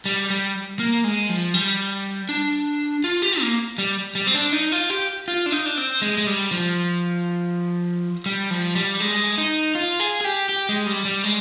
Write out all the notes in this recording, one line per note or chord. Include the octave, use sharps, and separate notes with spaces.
G3
G3
A#3
G#3
F3
G3
D4
F4
G4
A#3
G3
G3
C4
D4
D#4
F4
G4
F4
D4
D#4
D4
C4
G#3
G#3
G3
F3
G3
F3
G3
G#3
D#4
F4
G#4
G#4
G4
G4
G#3
G3
G3
G#3